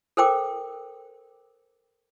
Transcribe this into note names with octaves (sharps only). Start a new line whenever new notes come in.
A4 A#4 C5 G5 D6